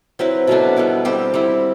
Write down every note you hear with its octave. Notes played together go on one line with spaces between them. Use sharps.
F#3 C4 E4 B4
B2 F#3 A3 D4
G3 B3 E4
G3 C4 G4 C5
G3 C4 E4